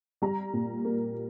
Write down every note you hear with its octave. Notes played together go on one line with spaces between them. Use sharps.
G3 A#5
A#2
A#3